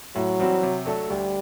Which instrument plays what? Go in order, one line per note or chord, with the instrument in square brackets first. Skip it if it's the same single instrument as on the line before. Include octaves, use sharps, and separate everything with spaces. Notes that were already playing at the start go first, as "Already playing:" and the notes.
[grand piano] A2 [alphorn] F#3
[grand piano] E3 G3 C4 F#4
C3
F#3 A3 D4 A4
[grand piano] D2 [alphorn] G3